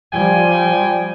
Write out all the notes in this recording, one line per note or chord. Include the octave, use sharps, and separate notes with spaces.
F3 G3 G5 G#5